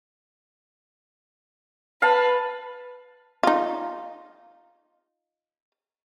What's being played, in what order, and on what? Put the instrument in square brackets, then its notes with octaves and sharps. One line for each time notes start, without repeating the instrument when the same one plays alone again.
[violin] B4 [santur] F5 A5
[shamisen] D#4 F4